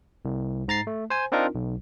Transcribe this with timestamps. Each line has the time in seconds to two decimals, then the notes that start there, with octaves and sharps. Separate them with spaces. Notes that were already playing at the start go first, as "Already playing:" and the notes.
0.25 C2
0.68 G#2 A#5 A6 C7
0.87 A3
1.10 C5 G#5
1.32 C4 D4 D#4 F4 A#4
1.55 B1